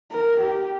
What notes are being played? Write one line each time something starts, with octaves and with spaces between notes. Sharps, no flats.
A#4
G4